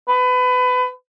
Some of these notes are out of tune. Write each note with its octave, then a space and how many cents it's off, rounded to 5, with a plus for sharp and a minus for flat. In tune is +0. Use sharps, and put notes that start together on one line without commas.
B4 +25